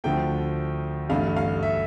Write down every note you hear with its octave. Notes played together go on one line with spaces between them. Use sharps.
D2 D3 F3 A3 G5
A1 G2 D3 A3 F5
F5
E5